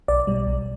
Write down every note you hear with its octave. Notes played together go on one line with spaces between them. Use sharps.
B1 D5
B2 G3
B1